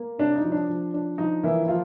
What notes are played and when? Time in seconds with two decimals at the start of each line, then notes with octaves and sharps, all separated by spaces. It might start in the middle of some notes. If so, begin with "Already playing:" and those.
Already playing: A#3
0.18 C3 D4
0.36 D#4
0.44 F3
0.52 D4
0.69 F3
0.94 D4
1.18 F3 D#4
1.43 E3 A#3 E4
1.63 E4
1.68 F3 F4